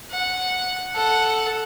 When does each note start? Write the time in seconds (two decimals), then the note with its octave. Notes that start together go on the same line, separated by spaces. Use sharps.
0.11 F#5
0.95 A4 F#5